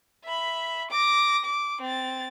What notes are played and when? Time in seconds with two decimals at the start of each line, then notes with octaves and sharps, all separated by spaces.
0.24 E5 B5
0.91 D6 A#6
1.44 D6
1.81 C4 A6